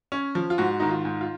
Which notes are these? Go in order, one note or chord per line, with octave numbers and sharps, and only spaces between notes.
C#4
F3
F4
G#2 F#4
D#3 D#4
F4
G#2
F4